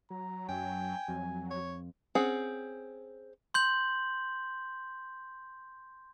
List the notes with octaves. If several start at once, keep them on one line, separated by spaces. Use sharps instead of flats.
F#3 A#5
F#2 G5 G#5
F2 F#3
C#5
C4 C#4 G#4 F#5
C6 G6 F#7